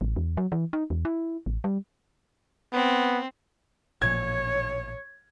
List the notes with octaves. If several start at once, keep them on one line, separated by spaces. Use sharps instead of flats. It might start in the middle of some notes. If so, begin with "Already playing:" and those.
A1
E2
F#3
E3
D#4
E2
E4
A1
G3
B3 C4
A1 A#2 F3 C#5 G#6